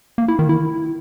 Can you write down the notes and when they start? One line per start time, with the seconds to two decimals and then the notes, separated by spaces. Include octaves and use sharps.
0.18 A#3
0.28 E4
0.39 D#3
0.49 E4